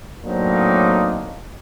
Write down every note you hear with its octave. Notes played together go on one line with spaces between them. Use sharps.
A2 F#3 A#3 C4 D4 D#4